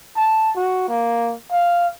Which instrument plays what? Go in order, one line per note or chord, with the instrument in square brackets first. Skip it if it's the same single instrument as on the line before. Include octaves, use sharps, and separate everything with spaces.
[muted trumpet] A5
F#4
A#3
F5